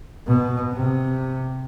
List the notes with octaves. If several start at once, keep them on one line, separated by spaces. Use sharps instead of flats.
B2
C3